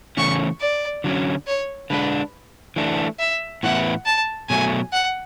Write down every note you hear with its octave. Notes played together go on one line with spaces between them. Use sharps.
C#3 E3 A3 C#4 E4 C#6
D5
D3 F#3 C#4
C#5
D3 G#3 D4 B4
E3 A3 D4
E5
A2 E3 B3 E4 F#5
A5
B2 F#3 A3 G#5
F#5